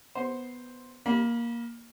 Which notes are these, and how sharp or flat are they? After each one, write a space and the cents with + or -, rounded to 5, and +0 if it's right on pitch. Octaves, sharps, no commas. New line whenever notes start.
B3 +0 C5 +0
A#3 +10 B5 -30